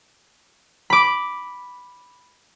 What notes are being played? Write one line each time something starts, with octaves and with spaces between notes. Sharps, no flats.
B5 D6